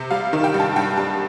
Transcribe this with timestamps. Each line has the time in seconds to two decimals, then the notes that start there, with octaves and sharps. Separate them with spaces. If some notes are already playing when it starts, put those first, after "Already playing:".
Already playing: C3
0.11 G3 F5
0.33 D#3
0.44 G5
0.54 G2
0.60 A5
0.76 G2 G5
0.97 G3 A5